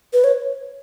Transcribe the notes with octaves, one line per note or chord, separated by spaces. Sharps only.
B4
C#5